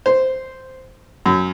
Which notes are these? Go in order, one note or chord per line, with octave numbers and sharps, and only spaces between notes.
C5
F#2